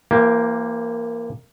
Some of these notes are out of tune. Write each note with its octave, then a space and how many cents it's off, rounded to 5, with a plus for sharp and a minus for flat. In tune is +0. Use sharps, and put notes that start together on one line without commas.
E3 +40 A#3 +0 G4 +0